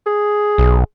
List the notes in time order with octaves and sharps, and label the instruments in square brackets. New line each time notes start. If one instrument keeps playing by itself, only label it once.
[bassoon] G#4
[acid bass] B1